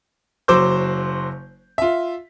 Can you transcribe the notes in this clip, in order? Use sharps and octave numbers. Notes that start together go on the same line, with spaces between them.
F#1 F#3 C5 D6 E6 G6
F4 E5